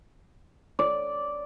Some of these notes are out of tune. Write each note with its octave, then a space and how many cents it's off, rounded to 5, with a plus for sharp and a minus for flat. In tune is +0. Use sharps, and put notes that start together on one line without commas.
D5 -10